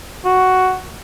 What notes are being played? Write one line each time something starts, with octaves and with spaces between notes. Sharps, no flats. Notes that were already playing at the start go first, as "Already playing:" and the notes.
F#4